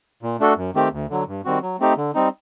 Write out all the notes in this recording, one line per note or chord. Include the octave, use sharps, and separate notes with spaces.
A#2
A3 D4 F#4 A4
F#2
D#3 A3 C4 G4
D2
D3 F#3
G2
D#3 G3 C4 F#4
F#3
A3 C4 D#4 G4
D3
G3 C4 D#4